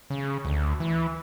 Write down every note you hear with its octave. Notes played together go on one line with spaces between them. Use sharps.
C#3
D2
E3